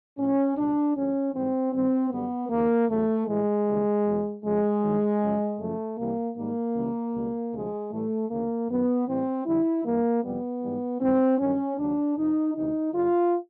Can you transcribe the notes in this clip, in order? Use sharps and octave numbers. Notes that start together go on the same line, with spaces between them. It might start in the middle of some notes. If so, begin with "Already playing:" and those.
A2 F3 C#4
C#2 B2 G3 D4
D2 D3 F3 C#4
G#2 E3 G3 C4
G2 D#3 G3 C4
F#2 D3 G3 B3
D#2 C#3 F3 A#3
E2 C#3 F#3 A3
A2 E3 G3 G#3
D#2 C#3 E3 G3
E2 B2 F#3
F2 C#3 F3 G#3
G2 D#3 F#3
F#2 C#3 F3
F#2 C#3 F3 A3
C2 C3 E3 G3 A#3
G#2 D#3 G3 A#3
C#2 C#3 E3 G3
C#2 B2 G3
D2 C3 F3 G#3
A2 E3 G3 A3
D2 C#3 E3 A#3
F#2 D#3 F#3 B3
A2 E3 G3 C4
F2 D3 G3 E4
G2 E3 G3 A#3
F2 C3 E3 G3 B3
G#2 E3 G3
G#2 E3 G3 C4
G2 D#3 F#3 C#4
D#2 C#3 F#3 D4
F2 C3 F3 D#4
D2 C3 E3 D#4
G2 D3 G3 F4